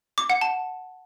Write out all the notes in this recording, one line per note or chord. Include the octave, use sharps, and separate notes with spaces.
D6
F#5
A5